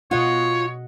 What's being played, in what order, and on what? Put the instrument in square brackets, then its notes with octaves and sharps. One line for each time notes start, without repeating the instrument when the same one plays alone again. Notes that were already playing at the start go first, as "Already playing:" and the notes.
[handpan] B2 D#5 F#5 [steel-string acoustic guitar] F4 [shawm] C#5